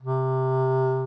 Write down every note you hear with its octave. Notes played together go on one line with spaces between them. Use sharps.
C3